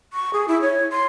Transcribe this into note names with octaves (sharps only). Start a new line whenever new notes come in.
C#6
G#4
E4
C#5
C6